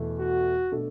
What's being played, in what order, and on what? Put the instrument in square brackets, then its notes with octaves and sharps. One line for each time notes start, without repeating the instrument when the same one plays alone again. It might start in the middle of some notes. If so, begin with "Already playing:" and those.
Already playing: [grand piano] E2 B2 A3
[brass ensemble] F#4
[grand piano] B2 A3 D4 A4